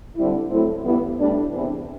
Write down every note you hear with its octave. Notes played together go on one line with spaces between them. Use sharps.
D3 G3 C4 E4
A2 F#3 A3 C4 E4
G2 E3 G3 B3 E4
A2 G3 D4
E2 C3 E3 B3 D4